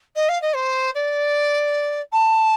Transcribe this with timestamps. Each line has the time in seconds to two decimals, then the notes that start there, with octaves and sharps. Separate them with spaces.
0.16 D#5
0.29 F5
0.42 D#5
0.55 C5
0.95 D5
2.12 A5